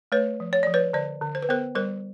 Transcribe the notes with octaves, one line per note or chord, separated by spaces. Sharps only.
A3 B4 C#5
F3
C#5
F3 D5
B4 C#5
D3 C5 D5
D3
C5
B4
B3 A#4 C5
G3 A#4 C5